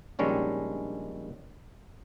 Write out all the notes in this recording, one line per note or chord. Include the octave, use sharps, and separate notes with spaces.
A#1 D#3 G3 G#3 C#4 D4